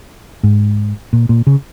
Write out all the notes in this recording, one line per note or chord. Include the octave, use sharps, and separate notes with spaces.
G#2
A#2
A#2
C#3